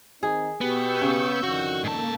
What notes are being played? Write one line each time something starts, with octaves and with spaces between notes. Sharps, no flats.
D#3 C4 D#4 G#4
B2 B3 G4 C#6 E6 G6
C#3
F2 D3 D#3 F#4
G#2 A#3 A4 A5